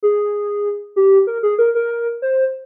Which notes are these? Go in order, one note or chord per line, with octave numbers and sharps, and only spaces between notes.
G#4
G4
A#4
G#4
A#4
A#4
C5